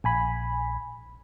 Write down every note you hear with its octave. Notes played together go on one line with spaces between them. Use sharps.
A#1 G#5 B5